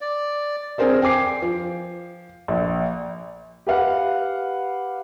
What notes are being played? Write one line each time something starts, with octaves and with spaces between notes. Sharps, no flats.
D5
C4 G#4 A#4 C5 D5
G5 G#5 D6 C7
F3
A#1
G4 B4 F5 F#5